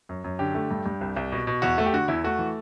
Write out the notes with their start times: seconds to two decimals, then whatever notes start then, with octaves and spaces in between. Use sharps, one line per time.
0.09 F#2
0.24 F#2
0.39 D3 G4
0.55 A3
0.71 G2
0.86 G2
1.01 C2
1.17 C2
1.32 B2
1.47 B2
1.62 E2 F#4
1.78 A3
1.86 G4
1.93 D3 F#4
2.08 E2 E4
2.24 A3 F#4
2.39 E3